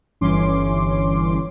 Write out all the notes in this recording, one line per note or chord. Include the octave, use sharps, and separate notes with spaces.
G1 E3 C#4 C6 D6